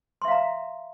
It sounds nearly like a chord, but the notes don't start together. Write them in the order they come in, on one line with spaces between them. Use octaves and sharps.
C6 E5 F5 A#5